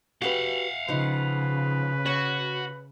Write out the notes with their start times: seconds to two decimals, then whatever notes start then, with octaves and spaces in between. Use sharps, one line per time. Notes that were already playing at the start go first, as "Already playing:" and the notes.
0.22 F#4 G4 B4 F5 F#5
0.88 C#3 F3 D#4 B4
2.06 F#4 C#5